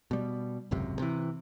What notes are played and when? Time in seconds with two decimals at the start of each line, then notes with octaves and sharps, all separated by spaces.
0.11 B2 G3
0.71 G#1 C#2 F#2 C3
0.99 C3 E3